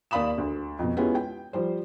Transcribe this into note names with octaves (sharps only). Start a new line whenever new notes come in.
D#2 D5 F5 B5 D#6 E7
D2
F2 B2
G#3 B3 C#4 E4 F4 G4
G5
F3 G3 C5